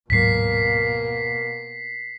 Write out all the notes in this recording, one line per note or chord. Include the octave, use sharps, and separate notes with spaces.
D1 G#2 B2 F#3 A#3 B6 C7